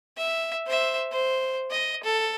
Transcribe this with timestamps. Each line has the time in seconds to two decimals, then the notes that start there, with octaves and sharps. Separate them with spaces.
0.17 E5
0.67 C5 E5
1.12 C5
1.71 D#5
2.03 A4